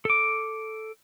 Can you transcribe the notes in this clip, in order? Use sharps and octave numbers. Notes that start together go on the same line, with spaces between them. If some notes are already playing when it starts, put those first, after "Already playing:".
A4 D6